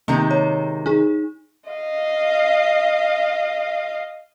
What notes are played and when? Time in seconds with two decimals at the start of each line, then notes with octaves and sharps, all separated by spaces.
0.08 C3 D#3 G#3 A#3
0.31 C#5
0.86 D#4 G#4
1.70 D#5 F5